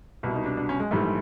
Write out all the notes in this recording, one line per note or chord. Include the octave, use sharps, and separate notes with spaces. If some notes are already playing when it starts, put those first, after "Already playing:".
C2 B2 G3 E4
D#4
D4
D4
C#4
G#3
A#1 G#2 E3 G3 A3